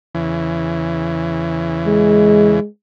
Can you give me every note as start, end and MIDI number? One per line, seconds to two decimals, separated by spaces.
0.15 2.60 40
0.15 2.60 49
0.15 2.60 52
1.86 2.67 56